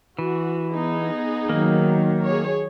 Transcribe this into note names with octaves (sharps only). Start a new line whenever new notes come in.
E3 F#4
B3 D#4 G#4
D#3 F#3 A#3
G#4 C#5